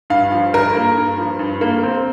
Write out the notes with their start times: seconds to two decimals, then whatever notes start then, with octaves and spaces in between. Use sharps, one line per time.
0.10 G2 F5
0.31 F3
0.53 G2 A#4
0.75 A#3
0.97 G2
1.18 F3
1.39 G2
1.61 A#3
1.83 C4